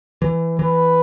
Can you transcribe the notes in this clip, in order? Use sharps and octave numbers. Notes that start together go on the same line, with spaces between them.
E3
E3 B4